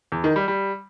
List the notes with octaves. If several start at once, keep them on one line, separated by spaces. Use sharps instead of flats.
E2
D#3
G3
G3